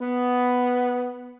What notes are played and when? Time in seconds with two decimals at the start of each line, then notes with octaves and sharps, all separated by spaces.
0.01 B3